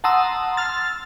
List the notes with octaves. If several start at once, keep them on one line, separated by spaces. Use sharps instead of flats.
F#5 A5 A#5 C6 D#6 E6
C6 E6 F6 A6